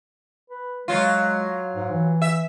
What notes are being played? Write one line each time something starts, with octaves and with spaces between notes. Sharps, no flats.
B4
F#3 G#3 F4
G#2
E3
E5